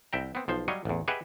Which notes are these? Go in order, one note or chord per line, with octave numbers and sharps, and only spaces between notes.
C2 E5 G5 A#5
B3 C4
B1 F3 C5
F#3 G3 C#5 D#5 F5
A1 E2
G4 G#4 B4 D#5 E5 F#5